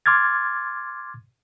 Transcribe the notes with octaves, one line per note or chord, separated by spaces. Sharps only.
C6 D6 F6 G#6 A6